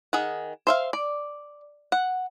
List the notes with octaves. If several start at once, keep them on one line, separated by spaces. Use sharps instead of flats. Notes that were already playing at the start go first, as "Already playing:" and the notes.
D#3 G#4 F#5
C5 E5 F5
D5
F#5